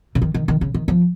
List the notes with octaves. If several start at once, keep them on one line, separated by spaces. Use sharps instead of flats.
C#3
D#3
D#3
D#3
C#3
D#3
F3